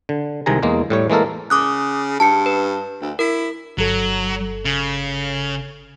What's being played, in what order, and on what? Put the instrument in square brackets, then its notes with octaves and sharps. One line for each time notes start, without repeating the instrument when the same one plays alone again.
[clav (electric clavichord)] D3
C2 C3 D#3 G#3 G#5 A#5
E2 G#3 A#3
A2 G3 C#5
E3 G#3 A#3 A4 A#4
[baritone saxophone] C#3 [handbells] D6 D#6 F#6
[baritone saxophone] G2 [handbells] A5 C#7
[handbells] B4
[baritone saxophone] D2
[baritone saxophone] E4 [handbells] A#4
[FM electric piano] G1 A4 [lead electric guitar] F#3
[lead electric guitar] C#3